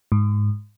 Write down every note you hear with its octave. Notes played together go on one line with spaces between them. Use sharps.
G#2